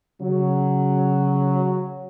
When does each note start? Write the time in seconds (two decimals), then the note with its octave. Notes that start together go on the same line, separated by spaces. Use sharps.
0.20 C#3 F#3